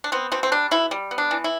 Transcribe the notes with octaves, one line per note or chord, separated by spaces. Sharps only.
D4
B3 C4
B2 C4
C4
G3 D4
B2 E4
G3
B3
D4
E3
E4